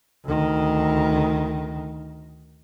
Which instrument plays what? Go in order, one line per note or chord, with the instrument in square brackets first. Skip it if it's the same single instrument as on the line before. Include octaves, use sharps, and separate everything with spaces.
[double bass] D2 D#3